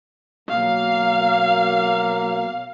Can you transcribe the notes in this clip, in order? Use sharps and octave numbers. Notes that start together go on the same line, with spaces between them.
B2 F#3 A#3 F5